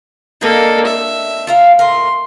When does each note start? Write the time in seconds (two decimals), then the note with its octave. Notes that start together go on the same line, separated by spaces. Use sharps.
0.41 A#3 D4 A4 D#5
0.86 E5
1.47 F4 A#4 F5
1.79 A2 F4 A#4 C6